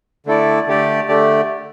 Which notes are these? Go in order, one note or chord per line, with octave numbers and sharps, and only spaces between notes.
D3 A3 E4 A4 D5
D3 A3 G4 D5
D3 A3 G4 D5